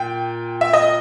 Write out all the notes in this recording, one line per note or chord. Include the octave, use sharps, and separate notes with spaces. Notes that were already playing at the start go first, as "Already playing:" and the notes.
Already playing: A#2 G5
E5
D#5